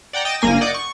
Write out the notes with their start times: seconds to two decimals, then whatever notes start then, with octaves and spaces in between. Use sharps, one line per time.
0.13 D5 F#5 G5 A#5
0.25 D#5 G5 A6 D7 E7
0.41 G1 A#3 G#5 A#6
0.61 D5 D#5 F#5 D6 G6
0.74 C#6